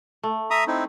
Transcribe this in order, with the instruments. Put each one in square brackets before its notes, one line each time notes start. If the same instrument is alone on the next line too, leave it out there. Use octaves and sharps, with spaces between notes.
[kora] A3
[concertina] E5 A#5 D#6
C4 D#4 E4